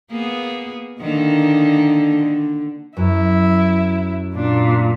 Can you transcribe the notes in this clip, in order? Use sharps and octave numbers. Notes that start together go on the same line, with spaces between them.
A#3 B3 G#4
D3 D#3 A#3
D3
F#2 E4
A#2 D4